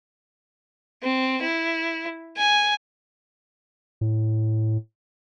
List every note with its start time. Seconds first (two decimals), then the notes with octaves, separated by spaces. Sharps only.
1.02 C4
1.42 E4
2.37 G#5
4.01 A2